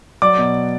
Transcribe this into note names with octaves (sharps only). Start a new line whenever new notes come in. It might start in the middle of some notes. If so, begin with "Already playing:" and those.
F#3 D5 D6
B2